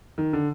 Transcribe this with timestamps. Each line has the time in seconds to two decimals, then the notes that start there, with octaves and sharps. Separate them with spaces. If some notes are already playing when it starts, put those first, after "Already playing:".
0.18 D#3
0.33 D3